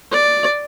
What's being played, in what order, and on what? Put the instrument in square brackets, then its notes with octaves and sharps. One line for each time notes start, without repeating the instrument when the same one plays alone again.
[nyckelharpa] D5